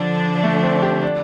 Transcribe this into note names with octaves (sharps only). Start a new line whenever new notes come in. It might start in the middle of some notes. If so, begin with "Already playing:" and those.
Already playing: D3 F3 D4
A3
C4
G4
D4